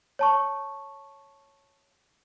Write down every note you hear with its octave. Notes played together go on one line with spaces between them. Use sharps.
C#5 A5 C#6